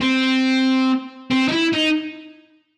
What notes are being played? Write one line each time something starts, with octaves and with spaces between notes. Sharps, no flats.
C4
C4
D#4
E4
D#4